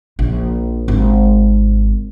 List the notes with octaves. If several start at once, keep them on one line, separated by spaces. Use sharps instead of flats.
A#1
G#1